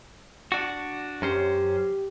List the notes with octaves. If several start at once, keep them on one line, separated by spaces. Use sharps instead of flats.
D4 F#4
F#2 C#4 G4 C5